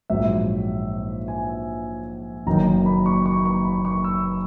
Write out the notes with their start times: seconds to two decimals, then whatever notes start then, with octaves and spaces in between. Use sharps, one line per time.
0.10 A#1 G#2 F#3 E5
1.28 G#5
2.47 F#1 F#2 D#3 A#3 D#4 A#5
2.86 B5
3.06 C#6
3.26 C#6
3.46 C#6
3.65 B5
3.85 C#6
4.04 E6